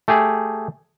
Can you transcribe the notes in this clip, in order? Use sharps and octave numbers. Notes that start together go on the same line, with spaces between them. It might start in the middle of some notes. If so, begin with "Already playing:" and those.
A3 G4 G#4